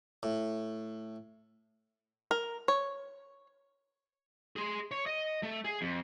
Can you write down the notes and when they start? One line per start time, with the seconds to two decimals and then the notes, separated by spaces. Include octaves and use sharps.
0.23 A2
2.31 A#4
2.68 C#5
4.56 G#4 C6
4.91 C#5
5.06 D#5
5.43 A3
5.64 G#4
5.81 F2